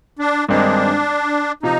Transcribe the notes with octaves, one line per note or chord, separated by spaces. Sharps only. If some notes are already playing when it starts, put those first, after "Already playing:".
D4
G2 D#3 G#3 C4 D4 D#4
C3 F3 D#4